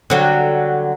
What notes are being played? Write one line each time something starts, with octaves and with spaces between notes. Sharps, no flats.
D3 F#3 G3